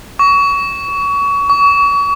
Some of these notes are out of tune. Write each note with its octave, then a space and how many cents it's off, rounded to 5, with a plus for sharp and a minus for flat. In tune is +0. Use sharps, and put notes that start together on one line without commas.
C#6 +30
C#6 +40